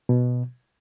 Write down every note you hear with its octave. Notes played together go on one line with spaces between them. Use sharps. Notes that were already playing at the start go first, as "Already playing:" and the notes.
B2